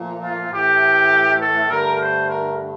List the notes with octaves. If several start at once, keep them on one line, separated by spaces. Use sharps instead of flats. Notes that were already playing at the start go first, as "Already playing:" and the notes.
Already playing: A#2 F3 A3
F4
A2 E3 A3 G4
A4
G2 D3 A3 A#4
C5
A#4